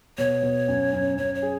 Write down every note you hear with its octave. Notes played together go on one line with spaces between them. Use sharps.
B2 C#5
B2
F#2
F#2
F#2 C#5
C#5
G#4